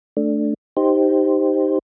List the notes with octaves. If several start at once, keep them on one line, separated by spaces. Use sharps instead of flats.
A3 D4
D#4 G4 C5